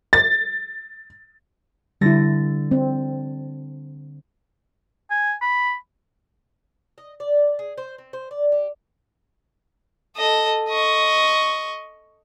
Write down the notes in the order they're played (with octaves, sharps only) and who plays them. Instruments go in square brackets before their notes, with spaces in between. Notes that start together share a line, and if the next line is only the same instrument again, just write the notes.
[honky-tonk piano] A6
[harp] D3 A6 A#6 [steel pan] G3 E4
[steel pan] C4
[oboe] G#5
B5
[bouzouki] D#5
D5
G#4
C5
C4
C5
D5
G4
[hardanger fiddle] A4 D#5
D#5 C#6